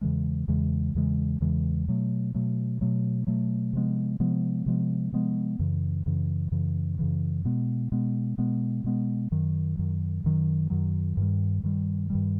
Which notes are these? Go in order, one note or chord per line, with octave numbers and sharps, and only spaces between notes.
E2 C#3 E3 G#3
E2 C#3 E3 G#3
E2 C#3 E3 G#3
E2 C#3 E3 G#3
B2 F#3 A3
B2 F#3 A3
B2 F#3 A3
B2 F#3 A3
C3 F3 G#3 B3
C3 F3 G#3 B3
C3 F3 G#3 B3
C3 F3 G#3 B3
F#2 C#3 E3
F#2 C#3 E3
F#2 C#3 E3
F#2 C#3 E3
B2 G#3 B3
B2 G#3 B3
B2 G#3 B3
B2 G#3 B3
F#2 D#3 F#3
F#2 D#3 F#3
F#2 D#3 F#3
F#2 D#3 F#3
G2 D#3 G3
G2 D#3 G3
G2 D#3 G3